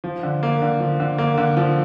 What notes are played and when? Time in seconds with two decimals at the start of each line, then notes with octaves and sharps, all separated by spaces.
0.04 F3
0.23 D3
0.43 A#3
0.62 D3
0.80 F3
1.00 D3
1.18 A#3
1.38 D3
1.57 F3